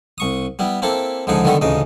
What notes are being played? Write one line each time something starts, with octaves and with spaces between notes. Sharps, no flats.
C2 C#6 D#6
G3 B3 E4
A#3 C4 E4 A4 D6
C#2 D3 F3 D#4 G#4 F#5
D3 D#3 G3 B3 F#4 A4
A1 D2 C#3 D#4 D#5